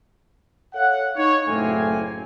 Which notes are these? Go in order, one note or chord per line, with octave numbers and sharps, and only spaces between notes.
A4 C#5 F5 F#5
D#4 C#5
F#1 A2 A3 A#3 C4 G#5